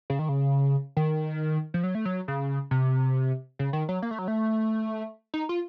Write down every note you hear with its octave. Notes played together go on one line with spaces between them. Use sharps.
C#3
D#3
C#3
D#3
F3
F#3
A3
F#3
C#3
C3
C#3
D#3
F#3
A#3
A3
F#3
A3
D#4
F4